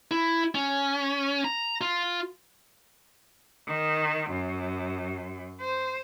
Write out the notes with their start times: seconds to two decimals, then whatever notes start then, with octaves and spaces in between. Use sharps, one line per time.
0.11 E4
0.55 C#4
1.44 A#5
1.81 F4
3.68 D#3
4.30 F#2
5.61 C5